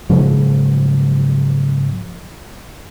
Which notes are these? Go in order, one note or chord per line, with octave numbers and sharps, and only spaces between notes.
G#2 C#3 F3 F#3